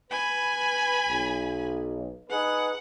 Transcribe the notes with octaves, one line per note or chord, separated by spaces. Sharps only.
B4 G#5 B5
B1
D#4 G#4 B4 F#5